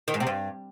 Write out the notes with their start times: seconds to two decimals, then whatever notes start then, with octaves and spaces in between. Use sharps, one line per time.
0.08 D#3
0.14 G#2
0.20 C3
0.27 G2